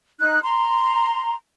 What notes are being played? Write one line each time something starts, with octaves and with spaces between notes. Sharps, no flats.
D#4 F#6
A#5 C6